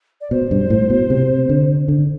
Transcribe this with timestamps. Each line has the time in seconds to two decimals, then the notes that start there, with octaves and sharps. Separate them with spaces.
0.21 D5
0.31 B2 C5
0.51 G2
0.70 A2
0.90 B2
1.10 C3
1.49 D3
1.88 D3